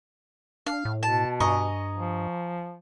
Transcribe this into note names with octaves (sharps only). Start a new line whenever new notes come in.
D4 F5
A2
B2 A5
G2 D#5 G#5 A#5 C#6
F3